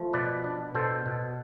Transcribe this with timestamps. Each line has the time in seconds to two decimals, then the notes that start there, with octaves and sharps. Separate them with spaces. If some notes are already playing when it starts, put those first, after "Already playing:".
Already playing: F3 A3
0.13 B2 B4 D5
0.44 D4
0.75 B2 A4 C5
1.06 B2